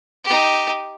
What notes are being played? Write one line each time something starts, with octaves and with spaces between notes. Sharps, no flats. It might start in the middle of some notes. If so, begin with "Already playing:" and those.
D#4 G4